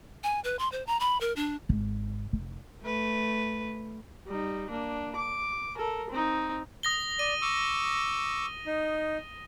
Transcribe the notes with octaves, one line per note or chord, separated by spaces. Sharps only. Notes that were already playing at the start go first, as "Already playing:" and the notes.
G#5
B4
C6
C5
A#5
B5
A#4
D4
G#1
F1
A3 B4
G3 D#4
A#3 D4
D6
A4 A#4
C4 D#4
D#6 A#6 G7
D5 D#7
C#6 D6 E6
D#4